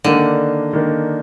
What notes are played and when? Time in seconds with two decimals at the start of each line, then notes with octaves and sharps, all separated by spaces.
0.04 D3 D#3 A#3 D4
0.73 D#3 A#3 D4